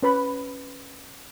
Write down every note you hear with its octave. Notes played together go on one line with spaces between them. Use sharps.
C#4 B4 B5